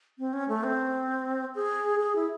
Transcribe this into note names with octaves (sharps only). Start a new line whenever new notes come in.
C4
C#4
A3
C4
G#4
G#4
E4